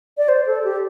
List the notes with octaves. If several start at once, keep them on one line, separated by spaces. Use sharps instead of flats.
D5
C5
A4
G4